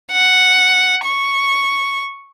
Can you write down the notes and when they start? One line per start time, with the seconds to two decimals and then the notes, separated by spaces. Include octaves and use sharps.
0.12 F#5
1.05 C#6